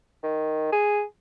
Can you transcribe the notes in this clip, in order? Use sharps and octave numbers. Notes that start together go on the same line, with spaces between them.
D#3
G#4